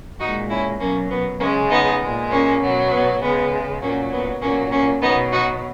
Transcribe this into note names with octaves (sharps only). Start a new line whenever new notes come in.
A#2 G#3 D#4 F#4
C#4 E4
B2 F#3 A#3 C#4
B3
C#3 G#3 A#3 C#4
B3 D#4
A#2 G#3
A#3 C#4
B2 F#3
B3
C#3 G#3 B3
A#2 F#3 A#3 C#4
B3
A#2 F#3 A#3 C#4
A#3 C#4
B2 F#3 B3 D#4
D#4 F#4